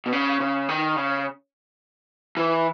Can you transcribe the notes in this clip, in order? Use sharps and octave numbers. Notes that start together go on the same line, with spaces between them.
B2
C#3
C#3
D#3
C#3
E3